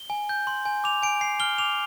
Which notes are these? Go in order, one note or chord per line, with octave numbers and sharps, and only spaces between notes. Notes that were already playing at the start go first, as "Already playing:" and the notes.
Already playing: G7
G#5
G6
C6
G#5
D6 F7
G#5 D7
G#5 C7
F6 G7
D6 F7